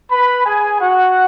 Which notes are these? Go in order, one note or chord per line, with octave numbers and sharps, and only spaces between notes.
B4 B5
G#4 G#5
F#4 F#5